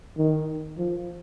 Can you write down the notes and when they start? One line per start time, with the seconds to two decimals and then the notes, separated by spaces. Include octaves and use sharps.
0.17 D#3
0.78 F3